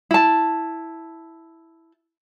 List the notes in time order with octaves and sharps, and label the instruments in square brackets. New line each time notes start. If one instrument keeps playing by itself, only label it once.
[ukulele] E4 A5